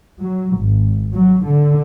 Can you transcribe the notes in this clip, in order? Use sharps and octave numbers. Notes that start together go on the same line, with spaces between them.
F#3
G#1
F#3
D3